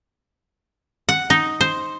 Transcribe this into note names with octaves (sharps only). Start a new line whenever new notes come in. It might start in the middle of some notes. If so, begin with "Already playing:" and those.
F#5
D#4
C5